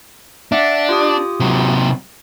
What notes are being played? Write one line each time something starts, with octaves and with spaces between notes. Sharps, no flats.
D4 E5 F#5
F4 G4 D#6
C3 F#3